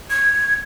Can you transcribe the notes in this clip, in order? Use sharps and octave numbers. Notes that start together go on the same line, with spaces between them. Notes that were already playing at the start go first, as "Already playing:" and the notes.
G#6